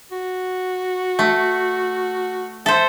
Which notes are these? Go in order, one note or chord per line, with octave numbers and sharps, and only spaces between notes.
F#4
A3
A4 C5 E5